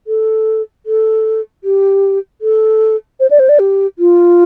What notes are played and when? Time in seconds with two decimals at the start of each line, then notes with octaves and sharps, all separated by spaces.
0.07 A4
0.86 A4
1.64 G4
2.41 A4
3.20 C5
3.30 D5
3.39 C5
3.49 D5
3.59 G4
3.99 F4